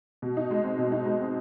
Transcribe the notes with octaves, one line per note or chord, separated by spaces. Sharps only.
B2
D#4
G#3
C4
B2
D#4
G#3
C4